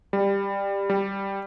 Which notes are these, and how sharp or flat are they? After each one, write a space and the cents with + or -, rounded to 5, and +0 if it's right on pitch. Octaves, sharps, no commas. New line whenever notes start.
G3 +15
G3 +0